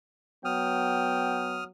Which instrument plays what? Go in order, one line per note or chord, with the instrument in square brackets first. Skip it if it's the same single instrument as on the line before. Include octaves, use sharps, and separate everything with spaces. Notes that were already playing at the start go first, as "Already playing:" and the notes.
[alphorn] F#3 [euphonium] B3 [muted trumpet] G5 [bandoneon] D#6 F6